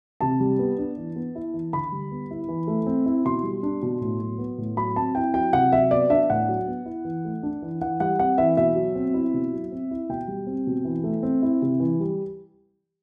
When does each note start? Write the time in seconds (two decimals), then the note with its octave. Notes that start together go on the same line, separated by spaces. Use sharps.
0.21 C3 A5
0.40 G3
0.59 B3
0.78 D4
0.97 E3
1.16 B3
1.35 E4
1.54 E3
1.73 D3 B5
1.92 G3
2.11 B3
2.31 E4
2.48 E3
2.67 A3
2.86 C4
3.06 E4
3.25 B2 C6
3.43 G3
3.63 D4
3.82 B2
4.01 A2
4.21 F#3
4.39 B3
4.58 A2
4.77 F#3 B5
4.96 C4 A5
5.15 E4 G5
5.34 F#3 G5
5.53 C3 F#5
5.72 F#3 E5
5.91 B3 D5
6.10 D4 E5
6.30 A2 F#5
6.49 F#3
6.68 B3
6.86 E4
7.05 E3
7.25 A3
7.43 D4
7.62 E3
7.81 E3 F#5
8.00 G3 F#5
8.19 C4 F#5
8.38 E3 E5
8.57 B2 E5
8.76 F#3
8.95 C4
9.14 E4
9.34 B2
9.53 F#3
9.72 C4
9.91 E4
10.09 B2 G5
10.28 G3
10.47 C4
10.67 B2
10.85 E3
11.04 A3
11.23 C4
11.42 E4
11.62 C3
11.80 E3
12.00 G3